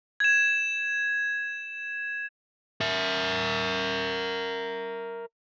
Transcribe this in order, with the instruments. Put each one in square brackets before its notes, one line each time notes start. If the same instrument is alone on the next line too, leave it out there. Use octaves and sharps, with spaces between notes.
[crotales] G#6 E7
[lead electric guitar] A#4 E5